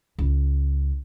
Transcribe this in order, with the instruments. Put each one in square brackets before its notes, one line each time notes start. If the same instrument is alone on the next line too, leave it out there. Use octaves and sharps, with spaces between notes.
[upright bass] C#2